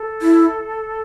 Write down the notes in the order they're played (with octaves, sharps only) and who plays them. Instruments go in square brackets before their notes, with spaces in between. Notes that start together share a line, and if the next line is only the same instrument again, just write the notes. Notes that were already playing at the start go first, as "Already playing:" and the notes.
Already playing: [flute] A4
[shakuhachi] E4